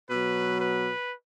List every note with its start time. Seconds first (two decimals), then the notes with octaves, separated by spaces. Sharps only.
0.08 B2 F#3 B4
0.59 B4